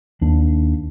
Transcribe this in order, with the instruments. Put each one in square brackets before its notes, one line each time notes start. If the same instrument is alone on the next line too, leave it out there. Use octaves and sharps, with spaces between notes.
[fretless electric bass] D#2 D4